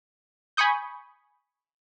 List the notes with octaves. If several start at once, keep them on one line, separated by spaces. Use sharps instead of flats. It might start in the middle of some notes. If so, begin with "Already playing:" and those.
G#5 B5 C#6 D#6 G6